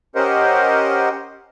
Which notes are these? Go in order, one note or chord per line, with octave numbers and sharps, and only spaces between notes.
C#4 G4 A#4 C5 D#5 F#5